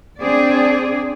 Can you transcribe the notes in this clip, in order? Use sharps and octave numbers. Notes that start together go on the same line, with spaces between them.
C4 D4 G#4 D5